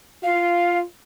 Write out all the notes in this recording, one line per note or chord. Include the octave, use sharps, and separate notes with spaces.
F4 F5